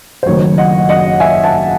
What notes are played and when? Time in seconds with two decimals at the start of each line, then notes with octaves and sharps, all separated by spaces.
0.23 C5
0.26 F#1 F#2 D#3 A3 C#5
0.58 D#5 F#5
0.89 D#5 F#5
1.20 E5 G#5
1.44 F#5 A5